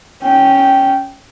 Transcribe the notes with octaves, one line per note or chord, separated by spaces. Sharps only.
C#4 G5